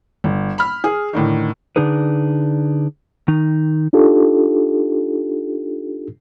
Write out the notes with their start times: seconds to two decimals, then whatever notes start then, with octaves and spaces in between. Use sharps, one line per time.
0.24 G1
0.58 B5 F6
0.84 G#4
1.13 A2 D3 D#3
1.76 D3 D4 D#4 G#4 B4
3.28 D#3 D#4
3.93 D4 D#4 F4 G4 A4